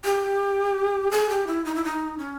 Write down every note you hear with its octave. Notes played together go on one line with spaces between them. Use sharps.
G4
G#4
G4
E4
D#4
E4
D#4
C#4